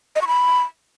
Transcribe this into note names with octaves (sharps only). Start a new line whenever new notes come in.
D#5
C#6
B5